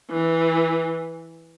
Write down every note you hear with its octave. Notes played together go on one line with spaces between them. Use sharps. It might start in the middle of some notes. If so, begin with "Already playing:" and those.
E3